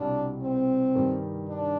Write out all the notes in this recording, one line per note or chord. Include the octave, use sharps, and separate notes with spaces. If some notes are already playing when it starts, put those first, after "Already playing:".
Already playing: C2 B2 G3 D4
C4
G2 D#3 G3
D4